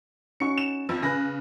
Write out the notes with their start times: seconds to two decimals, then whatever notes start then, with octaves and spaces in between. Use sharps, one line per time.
0.40 C#4 D#4 F#4 C#6 C#7
0.58 E7
0.89 F2 F3
1.02 C#3 B4 G#5 F#6 A#6